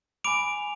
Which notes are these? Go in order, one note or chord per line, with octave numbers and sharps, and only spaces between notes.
G#5 B5 D6 D7 F7